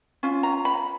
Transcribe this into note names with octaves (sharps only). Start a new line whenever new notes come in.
C#4 F4
A#5
B5